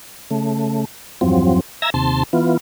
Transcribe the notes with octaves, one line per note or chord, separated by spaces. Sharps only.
C#3 A3
E2 G2 F3 F#3 C4
E5 A#5 E6 G#6 A#6
D#2 C3 A5 C6
E3 B3 F4